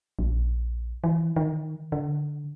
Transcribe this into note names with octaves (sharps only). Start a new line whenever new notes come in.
A#1
E3
D#3
D3